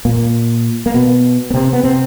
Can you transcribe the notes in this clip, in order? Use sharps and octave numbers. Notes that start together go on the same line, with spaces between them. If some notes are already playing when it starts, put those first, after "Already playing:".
A#2 A#3
A#3
B2 B3
B3
C3 C4
B3
C3 C4